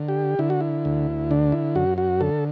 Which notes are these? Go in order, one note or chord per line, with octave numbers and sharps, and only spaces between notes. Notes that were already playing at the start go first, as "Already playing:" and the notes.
Already playing: D3
G4
D3 E4
F#4
E4
D2
D3 D4
E4
F#2 F#4
F#4
D3 A4